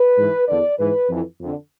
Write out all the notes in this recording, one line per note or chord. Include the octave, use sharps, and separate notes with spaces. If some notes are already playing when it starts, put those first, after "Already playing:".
Already playing: B4
G#2 E3
E2 D3 D5
G#2 E3 B4
F2 E3
F2 D3